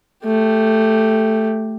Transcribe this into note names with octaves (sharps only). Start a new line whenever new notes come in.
A3 G4